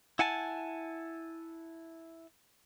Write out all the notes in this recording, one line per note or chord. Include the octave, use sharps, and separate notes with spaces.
E4 F#5 G#5 A5